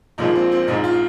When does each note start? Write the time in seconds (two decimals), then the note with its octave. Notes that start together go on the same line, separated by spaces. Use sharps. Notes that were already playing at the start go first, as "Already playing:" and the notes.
0.18 A#1 A#2 F3 G#3 D#4
0.35 C4
0.52 C4
0.68 A#1 G#2 G#3 D#4
0.84 F4